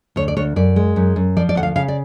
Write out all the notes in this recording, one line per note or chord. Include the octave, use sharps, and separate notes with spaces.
D2 C#5
D5
D2 C#5
F#2 D5
G#3
F#2
F#2
F3 D5
D5
D2 F#5
F5
C#3 F5
D5